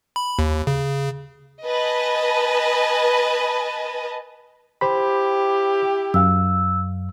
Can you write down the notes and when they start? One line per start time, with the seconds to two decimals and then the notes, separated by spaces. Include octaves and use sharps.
0.16 B5
0.39 D#2
0.67 C#3
1.65 B4 D#5 G#5 A5
4.81 E4 G4 C5 B5
6.14 F#2 F5 E6